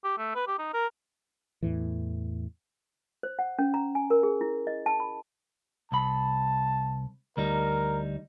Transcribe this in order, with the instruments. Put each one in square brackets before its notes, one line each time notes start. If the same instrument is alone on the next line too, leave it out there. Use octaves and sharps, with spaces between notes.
[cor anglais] G4
A3
B4
G4
D#4
A#4
[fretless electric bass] E2 A2 E3
[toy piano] C5
F#5
C#4
A#5
G#5
A#4
G#4
E4
D#5
A5
B5
[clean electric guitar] C2 B5 [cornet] A5
[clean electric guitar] D2 G3 D#4 [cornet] A#4